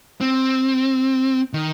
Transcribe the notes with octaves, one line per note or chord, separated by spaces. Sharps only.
C4
D#3